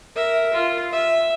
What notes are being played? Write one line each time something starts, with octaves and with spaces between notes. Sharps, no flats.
A#4 E5
F4
E5